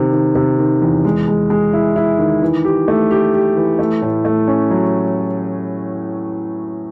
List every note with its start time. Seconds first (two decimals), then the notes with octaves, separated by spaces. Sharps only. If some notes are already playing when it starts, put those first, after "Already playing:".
Already playing: C3 D#3
0.12 D#3
0.35 C3
0.59 D#3
0.82 E2
1.05 G#3
1.28 G#3
1.50 G#3
1.73 E4
1.96 E4
2.19 D#3
2.42 E3
2.65 G4
2.88 A3
3.11 G4
3.34 G4
3.57 E3
3.79 A3
4.02 A2
4.25 A3
4.48 C#4
4.71 F#3